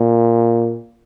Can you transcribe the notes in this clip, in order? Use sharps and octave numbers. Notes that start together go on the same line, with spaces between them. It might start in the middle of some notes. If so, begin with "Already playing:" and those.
Already playing: A#2